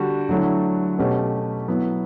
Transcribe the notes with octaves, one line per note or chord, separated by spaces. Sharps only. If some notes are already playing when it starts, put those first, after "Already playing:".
Already playing: D3 G3 D4 F#4
D3 F#3 A3 E4
B2 A3 C#4 G4 B4
F#3 B3 E4